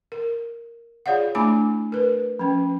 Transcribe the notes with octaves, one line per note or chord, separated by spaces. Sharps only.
A#4
F4 G#4 C#5 D5 F5 F#5
A3 D4 E4 G#5 B5 D6
A#4 B4
F3 C#4